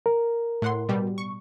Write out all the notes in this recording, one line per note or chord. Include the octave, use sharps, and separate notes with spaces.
A#4
A2 F#5 C6
B2 G3
C#6